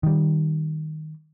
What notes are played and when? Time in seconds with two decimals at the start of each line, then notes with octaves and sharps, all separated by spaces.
0.03 D#3 G3